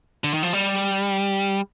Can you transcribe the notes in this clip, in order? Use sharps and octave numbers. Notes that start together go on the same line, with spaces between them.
D3
D#3
F3
G3